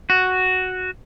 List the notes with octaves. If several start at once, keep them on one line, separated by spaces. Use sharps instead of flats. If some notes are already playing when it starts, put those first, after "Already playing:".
F#4